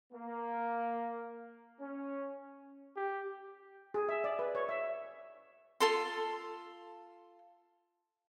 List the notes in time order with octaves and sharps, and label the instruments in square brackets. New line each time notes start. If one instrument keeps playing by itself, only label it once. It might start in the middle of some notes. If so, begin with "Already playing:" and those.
[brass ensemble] A#3
C#4
[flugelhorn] G4
[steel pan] G#4
E5
D5
B4
C#5
E5
[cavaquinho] F4 A4 C6